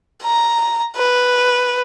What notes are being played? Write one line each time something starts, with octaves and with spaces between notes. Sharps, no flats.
A#5
B4